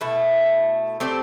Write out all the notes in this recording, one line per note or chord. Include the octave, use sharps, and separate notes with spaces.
B2 A3 E4
A3 C4 G4 D5